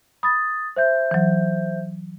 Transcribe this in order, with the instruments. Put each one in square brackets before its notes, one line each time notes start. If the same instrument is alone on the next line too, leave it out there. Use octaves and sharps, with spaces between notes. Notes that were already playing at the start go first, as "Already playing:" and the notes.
[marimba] B5 [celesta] D#6 A6
[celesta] C5 E5 G6
[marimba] E3 F#3